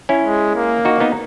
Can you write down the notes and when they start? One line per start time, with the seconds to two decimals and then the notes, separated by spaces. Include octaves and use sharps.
0.09 C#4 E4
0.24 G#3
0.55 A#3
0.85 D#4 F#4
1.00 B3 D#4